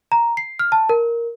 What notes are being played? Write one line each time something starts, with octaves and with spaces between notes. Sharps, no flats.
A#5
C7
F6
A5
A#4